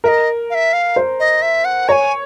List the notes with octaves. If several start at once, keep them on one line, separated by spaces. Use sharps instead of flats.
A#4 D#5 E5
F5
E5
F5
C5
D#5
E5
F#5
C#5 G#5 A#5